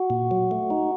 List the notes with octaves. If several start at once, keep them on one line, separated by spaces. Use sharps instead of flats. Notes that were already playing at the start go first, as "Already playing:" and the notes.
Already playing: F#4
A#2
F#3
A3
D#4